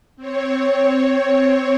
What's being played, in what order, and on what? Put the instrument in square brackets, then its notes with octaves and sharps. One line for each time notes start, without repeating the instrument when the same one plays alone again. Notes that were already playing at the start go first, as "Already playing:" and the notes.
[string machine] C4 C#5